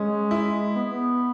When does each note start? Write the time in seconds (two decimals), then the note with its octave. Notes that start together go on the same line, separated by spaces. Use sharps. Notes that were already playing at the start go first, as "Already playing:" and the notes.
Already playing: G#3 C#4
0.31 E4
0.75 B3
0.90 B3